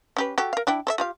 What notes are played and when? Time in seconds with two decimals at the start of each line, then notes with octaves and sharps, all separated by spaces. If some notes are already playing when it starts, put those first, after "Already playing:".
0.17 C#4 G4 B4
0.38 F#4 G4 A4
0.53 A#4 F5
0.67 D4 E4 G5
0.87 A4 C5 E5
0.98 F4 G4 F5